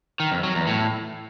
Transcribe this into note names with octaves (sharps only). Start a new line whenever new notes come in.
D#3
F2
F#3
E2
A2